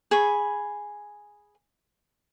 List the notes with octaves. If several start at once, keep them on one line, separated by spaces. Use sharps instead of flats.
G#4 B5 C#6